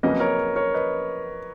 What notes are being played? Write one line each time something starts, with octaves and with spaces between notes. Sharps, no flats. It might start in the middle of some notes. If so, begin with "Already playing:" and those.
F2 C#3 F#3 A#3 C#4 B4 D#5
A#4 C#5
A#4 C#5
B4 D#5